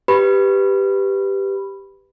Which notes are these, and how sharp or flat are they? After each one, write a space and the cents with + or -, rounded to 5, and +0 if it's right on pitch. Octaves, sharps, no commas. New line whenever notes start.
G4 +0 B4 +5 B5 +0